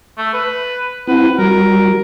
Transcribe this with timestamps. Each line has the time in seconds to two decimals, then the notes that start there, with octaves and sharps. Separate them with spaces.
0.18 A3
0.34 B4
1.07 C4 E4 B4 F#5
1.39 G3 F#4 A#4